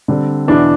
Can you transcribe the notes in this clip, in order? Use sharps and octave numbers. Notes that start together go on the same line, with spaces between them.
D3 G3 C4
E2 B2 B3 D4 E4